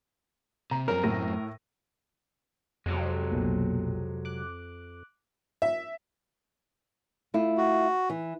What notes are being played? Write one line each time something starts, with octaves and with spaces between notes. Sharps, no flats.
C3 A#5
F#2 C4 A#4 C#5 A#5
A2 A#6 D#7
F2 C3 F#3 G#3
B1 A#2
D6 F#6
E5
A3 E4 F4
F#4
E3